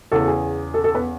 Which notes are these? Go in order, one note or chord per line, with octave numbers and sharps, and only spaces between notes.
E2 C#3 E3 A4
G#4
A4
A4
B3 B4